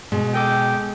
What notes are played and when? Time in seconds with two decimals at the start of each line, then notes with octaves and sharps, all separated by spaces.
0.12 B2 G#3
0.34 G#4 A4 G5 D6